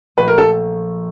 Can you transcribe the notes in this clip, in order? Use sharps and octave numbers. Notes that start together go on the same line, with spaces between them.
A#1 A#2 F3 A3 B4
A#4
A4